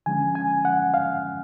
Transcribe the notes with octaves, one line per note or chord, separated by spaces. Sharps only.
D3 F3 G#3 C#4 G#5
G#5
F#5
F5